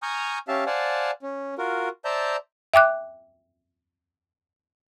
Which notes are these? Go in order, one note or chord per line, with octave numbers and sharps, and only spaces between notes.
G#5 A#5 C#6 D#6 F6 G6
C#4 G4 E5 F5 A5
C5 D5 F5 F#5 G#5 A5
C#4
F4 F#4 A#4
C5 D5 E5 A5 A#5 G6
E5 G5 D6 F#6